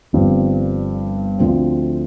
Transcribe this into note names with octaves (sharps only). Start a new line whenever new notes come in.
G1 G2 F3 C4
D2 D3 F3 A3 C4